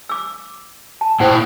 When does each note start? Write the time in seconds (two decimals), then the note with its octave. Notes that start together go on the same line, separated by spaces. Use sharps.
0.09 D6 E6
1.01 A5
1.20 A#2 E4 C5 F#5 G5